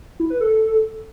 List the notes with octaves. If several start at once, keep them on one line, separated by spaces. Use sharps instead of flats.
E4
B4
A4